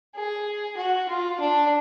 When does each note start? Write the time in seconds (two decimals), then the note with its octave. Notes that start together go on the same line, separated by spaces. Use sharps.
0.16 G#4
0.77 F#4
1.09 F4
1.40 D4